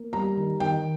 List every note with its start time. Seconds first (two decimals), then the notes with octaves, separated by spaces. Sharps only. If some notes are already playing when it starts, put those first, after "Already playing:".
Already playing: A#3
0.13 G3 A#5
0.37 D#3
0.60 D#3 G5